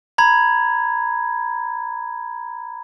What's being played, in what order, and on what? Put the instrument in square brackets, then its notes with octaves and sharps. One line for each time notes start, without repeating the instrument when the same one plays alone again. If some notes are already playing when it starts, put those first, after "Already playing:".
[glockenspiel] A#5 B5 G#6